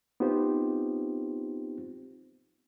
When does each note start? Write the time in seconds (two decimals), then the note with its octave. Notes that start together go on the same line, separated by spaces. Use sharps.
0.20 B3 C4 D#4 F4 G4 C5